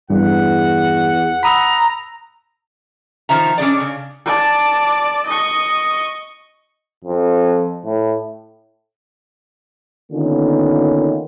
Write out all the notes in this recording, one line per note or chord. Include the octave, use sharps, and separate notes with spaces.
E2 G2 F#5
A#5 B5 D#6 E6
D#3 F3 E5 A#5
C#4 D4 G#4 D5
C#3
D5 A5
D#5 C#6
F2
A2
D3 D#3 A#3 B3 C#4 F4